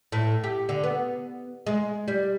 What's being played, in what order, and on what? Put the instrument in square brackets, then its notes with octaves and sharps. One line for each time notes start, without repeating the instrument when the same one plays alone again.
[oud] A2
G4
D3
B3
G#3
G3